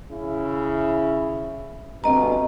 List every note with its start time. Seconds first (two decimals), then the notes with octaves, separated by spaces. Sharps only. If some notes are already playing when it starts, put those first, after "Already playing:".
0.11 C#3 E4
2.04 D2 G2 B2 C4 D#5 A#5